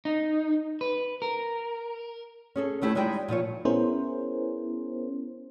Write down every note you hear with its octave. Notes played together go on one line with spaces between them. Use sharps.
D#4
B4
A#4
C#4 G#4 A4
D#2 A3 E4 G4 C#5 A5
G3 G#3 D#4 E4 D5 G5
A#2 F3 F4 C#5
B3 C#4 E4 G#4 A#4 C5